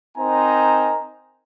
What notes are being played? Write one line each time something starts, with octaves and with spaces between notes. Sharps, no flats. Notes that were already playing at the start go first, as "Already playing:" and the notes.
C4 D#4 A#4 C5 G#5 A#5